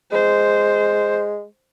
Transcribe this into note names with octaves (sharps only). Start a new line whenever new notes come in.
G#3 C5